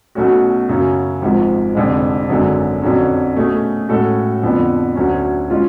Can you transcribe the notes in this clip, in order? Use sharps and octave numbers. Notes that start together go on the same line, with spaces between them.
B1 B2 A3 C#4 F#4
F#2 C#3 F#3 C#4
G#1 G#2 F3
F1 F2 D3 G#3
G#1 F#2 D3 G#3
F2 D3 F#3 C#4
B2 A3 C#4 G#4
A2 G#3 C#4 F#4 A4
F2 D3 F3 B3
D2 D3 F#3 C#4
G#3 C#4 F4